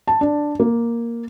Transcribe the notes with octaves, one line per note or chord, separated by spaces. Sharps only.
A5
D4
A#3